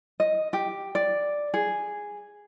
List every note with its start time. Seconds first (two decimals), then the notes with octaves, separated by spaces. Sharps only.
0.20 D#5
0.53 G4
0.95 D5
1.54 G#4